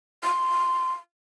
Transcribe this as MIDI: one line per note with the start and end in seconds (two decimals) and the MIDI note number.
0.24 0.92 84